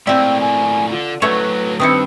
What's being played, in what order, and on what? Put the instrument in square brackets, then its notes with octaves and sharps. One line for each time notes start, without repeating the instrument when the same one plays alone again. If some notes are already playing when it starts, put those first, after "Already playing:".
[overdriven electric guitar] A2 A#3 [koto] C4 E5 [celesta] D5 [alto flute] G5
[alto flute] G#5
[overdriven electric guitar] D3 [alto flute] F4
[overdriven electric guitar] A2 F#3 [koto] A3 C#4 C#5 [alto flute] B4
[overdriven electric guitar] G2 [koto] D#3 C4 E4 [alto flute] B4 [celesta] D#6 C#7